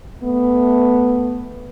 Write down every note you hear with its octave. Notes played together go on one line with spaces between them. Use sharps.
A3 B3